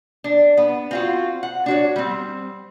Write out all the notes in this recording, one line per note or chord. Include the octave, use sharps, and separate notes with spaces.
D4
B3
C4 F4 F#4
F#5
D4 F#4 C#5
G3 C4